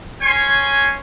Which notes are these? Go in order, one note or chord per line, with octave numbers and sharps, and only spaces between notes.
C#4 C#5 G#5 C6